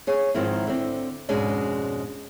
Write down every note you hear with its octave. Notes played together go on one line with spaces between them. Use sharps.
G#4 C#5
G#2 D#3 F3 C4 E4
D3 C4
F2 G#2 B2 G#3 C#4 D4